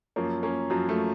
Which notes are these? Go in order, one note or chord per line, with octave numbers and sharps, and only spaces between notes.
F#2 F3 A#3 C#4
A#3 C#4
F#2 F3 F#3
F3 A3